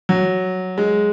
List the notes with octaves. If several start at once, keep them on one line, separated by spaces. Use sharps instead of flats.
F#3
G#3